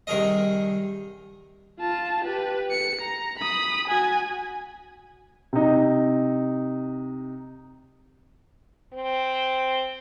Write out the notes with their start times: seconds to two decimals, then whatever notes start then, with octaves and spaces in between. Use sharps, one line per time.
0.07 C2 D#3 G#4 A#4 D#5
1.80 F4 A5
2.24 G4 B4
2.71 C#7
3.01 A#5
3.38 B5 D#6
3.88 F#4 G#5
5.53 C3 D#4
8.93 C4